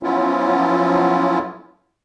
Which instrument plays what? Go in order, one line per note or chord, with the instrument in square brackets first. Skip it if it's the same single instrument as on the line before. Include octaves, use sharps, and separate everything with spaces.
[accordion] F3 F#3 B3 C#4 E4 F4